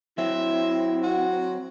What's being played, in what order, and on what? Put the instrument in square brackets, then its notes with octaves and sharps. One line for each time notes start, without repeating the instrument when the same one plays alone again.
[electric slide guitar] F#3 C4 [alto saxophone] E4 [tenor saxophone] E5
[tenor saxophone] F#4